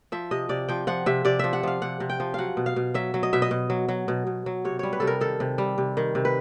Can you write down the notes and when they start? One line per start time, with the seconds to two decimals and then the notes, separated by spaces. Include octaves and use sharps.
0.12 F3 E5
0.31 C3 D#5
0.49 C3 D5
0.68 F3 G5
0.87 F3 F#5
1.06 C3 E5
1.25 C3 D5
1.39 F3 E5
1.53 F#5
1.63 F3 F5
1.82 C3 F#5
2.00 C3
2.10 G5
2.20 F3
2.34 F#3 F5 F#5
2.57 B2
2.66 F5
2.76 B2
2.94 F#3 E5
3.14 F#3
3.23 D#5
3.33 B2 E5
3.42 D#5
3.51 B2
3.70 F#3
3.89 F#3
4.08 B2
4.27 B2
4.46 F#3
4.65 C3 C#5
4.79 G3 C#5
4.93 B4
5.00 C3 A4
5.07 A#4
5.21 D#3 A4
5.40 C3
5.58 G3
5.78 C3
5.97 D#3
6.15 C3
6.25 B4